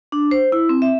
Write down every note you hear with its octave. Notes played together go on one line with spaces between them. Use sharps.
D4
C5
E4
C4
E5